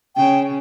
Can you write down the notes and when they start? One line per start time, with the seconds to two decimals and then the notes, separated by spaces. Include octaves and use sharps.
0.16 C#3 G5